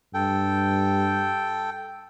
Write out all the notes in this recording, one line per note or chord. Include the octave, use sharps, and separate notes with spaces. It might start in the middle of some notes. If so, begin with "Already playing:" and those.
G2 A4 G5